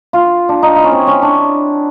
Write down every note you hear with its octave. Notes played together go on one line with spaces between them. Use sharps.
F4
D4
D#4
E4
C#4
C4
C#4
D4